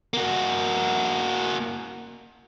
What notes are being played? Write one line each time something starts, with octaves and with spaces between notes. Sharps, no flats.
A#3 F#4